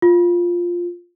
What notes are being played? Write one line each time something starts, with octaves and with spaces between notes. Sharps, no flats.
F4